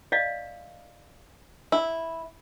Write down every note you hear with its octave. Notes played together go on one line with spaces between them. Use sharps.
D5 D#5 F5
E4